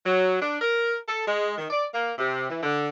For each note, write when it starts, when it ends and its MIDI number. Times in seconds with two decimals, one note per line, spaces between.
0.06 0.38 54
0.41 0.57 62
0.61 0.97 70
1.09 1.24 69
1.26 1.54 56
1.58 1.67 51
1.70 1.85 74
1.94 2.11 58
2.18 2.47 48
2.49 2.60 52
2.63 2.89 50